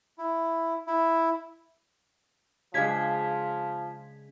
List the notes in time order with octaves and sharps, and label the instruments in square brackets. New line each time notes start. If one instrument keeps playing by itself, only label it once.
[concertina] E4
E4
[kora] C#3 G#3 D4 [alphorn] F3 [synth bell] G#6 B6